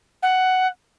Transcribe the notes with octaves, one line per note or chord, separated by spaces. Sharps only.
F#5